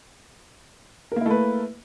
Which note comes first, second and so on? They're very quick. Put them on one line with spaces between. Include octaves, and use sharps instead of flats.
A#4 A#3 E4 A3 B4